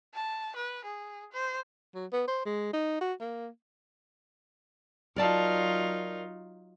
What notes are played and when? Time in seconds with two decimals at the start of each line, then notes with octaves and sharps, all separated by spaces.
0.14 A5
0.56 B4
0.85 G#4
1.32 C5
1.95 F#3
2.12 B3
2.27 C5
2.45 G#3
2.73 D#4
3.01 F#4
3.20 A#3
5.16 F#3 D#4 F4 A#4 D5 A5